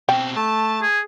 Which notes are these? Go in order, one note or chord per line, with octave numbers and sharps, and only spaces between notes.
B2 C4 G5
A3 A5
G#4